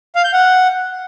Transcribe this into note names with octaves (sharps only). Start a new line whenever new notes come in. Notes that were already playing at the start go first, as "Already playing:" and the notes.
F5
G6
F#5